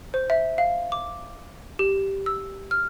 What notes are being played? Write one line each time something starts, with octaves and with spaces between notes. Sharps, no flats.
C5
E5
F5
D6
G4
E6
F6